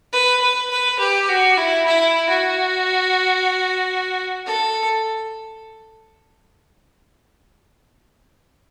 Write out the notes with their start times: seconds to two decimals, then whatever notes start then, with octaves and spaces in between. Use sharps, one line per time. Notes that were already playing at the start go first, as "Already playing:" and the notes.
0.13 B4
0.41 B4
0.70 B4
0.99 G4
1.28 F#4
1.57 E4
1.86 E4
2.29 F#4
4.46 A4